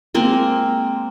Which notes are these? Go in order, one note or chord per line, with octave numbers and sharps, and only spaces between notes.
G#3 A#3 C4